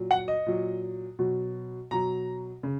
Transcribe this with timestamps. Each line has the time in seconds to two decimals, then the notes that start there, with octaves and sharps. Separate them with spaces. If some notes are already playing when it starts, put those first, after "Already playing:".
Already playing: A#2 F#3
0.11 F#5
0.28 D#5
0.46 A#2 F#3
1.19 B2 F#3
1.91 B2 F#3 A#5
2.63 C#3